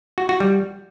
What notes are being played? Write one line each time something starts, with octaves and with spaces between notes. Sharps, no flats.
F#4
F#4
G3